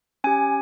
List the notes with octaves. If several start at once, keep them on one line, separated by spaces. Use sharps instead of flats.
C#4 G4 G#5